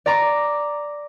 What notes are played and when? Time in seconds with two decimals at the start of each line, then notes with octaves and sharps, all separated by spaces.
0.06 D5 A#5 D6